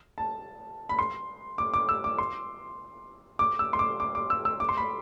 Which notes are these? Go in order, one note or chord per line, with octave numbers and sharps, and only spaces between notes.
A5
B5
C6
D6
D6
E6
D6
C6
D6
E6
C6
D6
D6
D6
E6
E6
D6
C6
B5